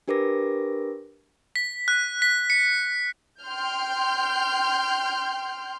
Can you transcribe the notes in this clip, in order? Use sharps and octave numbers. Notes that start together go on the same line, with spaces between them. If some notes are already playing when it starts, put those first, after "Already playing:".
D4 G4 A#4 B4 D6 A#6
B6
F#6
B6
C#7
G5 C6 F6 G6